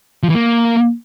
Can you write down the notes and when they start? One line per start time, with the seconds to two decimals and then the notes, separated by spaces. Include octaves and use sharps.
0.23 F3
0.29 E3
0.35 A#3